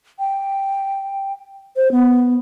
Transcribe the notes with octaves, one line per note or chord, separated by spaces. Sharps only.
G5
C5
B3